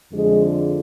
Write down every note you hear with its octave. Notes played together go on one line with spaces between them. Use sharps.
F2 D3 F3 G#3